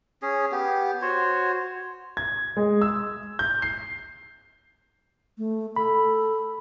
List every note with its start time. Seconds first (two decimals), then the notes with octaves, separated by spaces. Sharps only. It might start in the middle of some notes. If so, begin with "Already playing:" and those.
0.22 C#4 G#4
0.52 B3 G4
1.02 F#4 C5 C#5
2.17 G#6
2.57 G#3
2.81 E6
3.39 G6
3.62 C7
5.38 A3
5.76 A4 B5